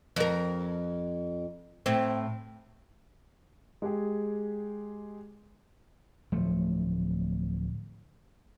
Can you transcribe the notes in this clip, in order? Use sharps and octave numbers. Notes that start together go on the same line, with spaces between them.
F2 A#4
A2 C4
G#3 G4 G#4
D1 F3 A3